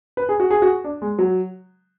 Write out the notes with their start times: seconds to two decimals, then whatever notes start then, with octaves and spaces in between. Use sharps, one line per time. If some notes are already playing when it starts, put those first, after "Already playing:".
0.17 B4
0.29 G#4
0.40 F#4
0.50 G#4
0.62 F#4
0.84 D4
1.02 G#3
1.19 F#3